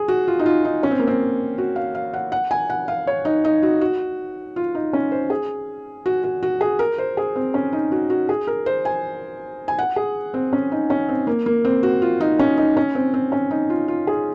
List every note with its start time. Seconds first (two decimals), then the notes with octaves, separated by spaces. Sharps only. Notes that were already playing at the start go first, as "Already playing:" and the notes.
Already playing: G#4
0.08 F#4
0.28 F4
0.39 D#4
0.46 F4
0.65 D#4
0.83 C#4
0.91 C4
0.99 A#3
1.07 C4
1.58 F#4
1.76 F5
1.95 F5
2.14 F#5
2.32 F#5
2.51 G#5
2.70 F#5
2.88 F5
3.07 C#5
3.25 D#4
3.45 D#4
3.63 F#4
3.81 F#4
4.56 F4
4.75 D#4
4.93 C#4
5.12 C5
5.30 G#4
6.06 F#4
6.24 F#4
6.43 F#4
6.61 G#4
6.79 A#4
6.98 C5
7.17 G#4
7.36 C4
7.54 C#4
7.73 D#4
7.92 F#4
8.10 F#4
8.29 G#4
8.47 A#4
8.66 C5
8.85 G#5
9.68 G#5
9.79 F#5
9.96 G#4
10.34 C4
10.53 C#4
10.72 D#4
10.90 C#4
11.08 C4
11.27 A#3
11.46 A#3
11.65 C4
11.83 F#4
12.02 F4
12.21 D#4
12.39 C#4
12.57 D#4
12.77 C#4
12.95 C4
13.14 C4
13.32 C#4
13.51 D#4
13.70 F4
13.88 F4
14.07 G#4